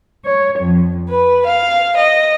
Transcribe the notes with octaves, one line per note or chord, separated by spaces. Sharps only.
C#5
F2
B4
F5
D#5